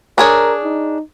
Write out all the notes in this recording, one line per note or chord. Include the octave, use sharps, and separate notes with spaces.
D4 G#4 A#4 C#5
D#4